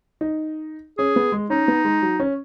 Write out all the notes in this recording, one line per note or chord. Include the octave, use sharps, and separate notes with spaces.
D#4
C#4 G#4
B3
G#3
C#4 D#4
B3
G#3
F#3
C#4